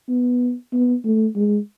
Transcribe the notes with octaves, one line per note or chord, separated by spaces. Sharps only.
B3
B3
A3
G#3